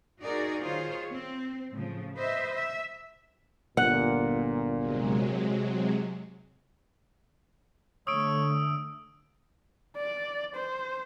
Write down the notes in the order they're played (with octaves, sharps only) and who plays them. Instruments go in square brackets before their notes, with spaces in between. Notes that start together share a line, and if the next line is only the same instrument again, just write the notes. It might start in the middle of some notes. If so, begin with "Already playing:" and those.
[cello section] D#4 F#4 G#4 A#4 D5
D#3 F4 G#4 C5 C#5
C4
A2 C#3 F3
B4 C5 D#5 E5
E5
[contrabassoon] G1 [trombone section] A#2 [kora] F#5
[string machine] C3 F#3 G#3
[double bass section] D3 A3 [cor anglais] C#5 [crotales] D#6 E6 D7
[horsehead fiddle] D5
C5